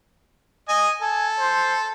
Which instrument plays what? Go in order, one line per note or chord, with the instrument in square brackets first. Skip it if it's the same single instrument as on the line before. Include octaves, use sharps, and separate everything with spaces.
[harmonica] D#5 G#5
[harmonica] A4 [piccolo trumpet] G#5
[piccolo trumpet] C5